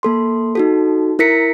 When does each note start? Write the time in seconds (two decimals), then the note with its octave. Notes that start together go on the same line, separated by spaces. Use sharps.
0.03 A#3 A4 C6
0.55 D#4 F#4 A4
1.19 E4 A#4 A#6 B6 C#7